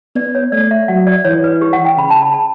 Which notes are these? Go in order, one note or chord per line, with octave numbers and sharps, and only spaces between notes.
B3 D5
C#5
A3 D5
E5
F#3 F#5
D5
E3 C#5
B4
G4
F#5
G5
C#3 B5
A5
B5
A5